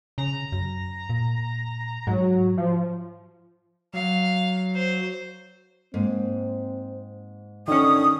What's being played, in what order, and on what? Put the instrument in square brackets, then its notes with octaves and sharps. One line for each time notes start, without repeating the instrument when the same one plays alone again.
[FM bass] C#3 [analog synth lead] A#5
[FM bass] F#2
A#2
[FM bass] G#2 [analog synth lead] F#3
[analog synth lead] F3
[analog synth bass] F#3 [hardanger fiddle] F5
[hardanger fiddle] C5
[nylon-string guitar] G#2 A#3 [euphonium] C4
[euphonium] D3 [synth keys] D#3 C#4 [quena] D#6